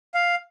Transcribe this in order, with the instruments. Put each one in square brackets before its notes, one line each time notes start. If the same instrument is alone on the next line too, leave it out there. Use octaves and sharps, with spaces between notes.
[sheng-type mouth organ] F5